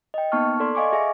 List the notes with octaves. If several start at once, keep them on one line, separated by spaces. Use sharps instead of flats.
D#5 G5
A#3 B3 D#4 A5 C#6 F6
A4 D5 C6
D#5 F5 G#5 C#6 D6
G#4 E5 G#5